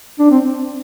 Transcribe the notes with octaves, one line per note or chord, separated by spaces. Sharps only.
D4
C4